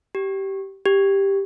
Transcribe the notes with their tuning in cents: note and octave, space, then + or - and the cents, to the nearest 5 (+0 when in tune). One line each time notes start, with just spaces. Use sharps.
G4 -15
G4 +5